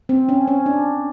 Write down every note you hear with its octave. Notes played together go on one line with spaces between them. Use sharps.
C4
C#4
C#4
D4